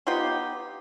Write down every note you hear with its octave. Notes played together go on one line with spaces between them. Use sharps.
B3 D#4 F4 G4